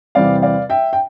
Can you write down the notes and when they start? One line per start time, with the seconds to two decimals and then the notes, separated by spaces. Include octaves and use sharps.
0.15 E2 C3 G3 C4 D5 F5
0.42 D5 F5
0.70 E5 G5
0.93 G5